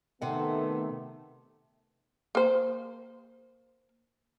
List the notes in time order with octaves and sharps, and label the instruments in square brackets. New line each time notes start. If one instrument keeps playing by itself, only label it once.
[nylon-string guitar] C3 F#5 [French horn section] D#3 A3 B3
[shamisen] A#3 C5